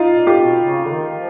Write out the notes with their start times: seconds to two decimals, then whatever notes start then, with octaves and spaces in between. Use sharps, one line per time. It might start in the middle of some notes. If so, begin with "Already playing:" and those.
Already playing: D#4 F4
0.14 A#2
0.27 F4 G4
0.39 B2
0.64 C#3
0.85 D3
0.90 D#3
1.15 F3